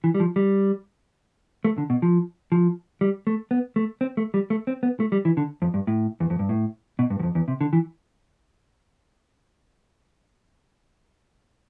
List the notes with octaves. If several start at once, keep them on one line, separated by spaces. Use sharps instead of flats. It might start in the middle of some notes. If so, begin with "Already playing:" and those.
E3
G3
F3
G3
A3
D3
B2
F3
F3
G3
A3
B3
A3
C4
A3
G3
A3
C4
B3
A3
G3
E3
D3
F2
G2
A2
E2
F2
G2
A2
B2
G2
E2
F2
E2
C3
D3
E3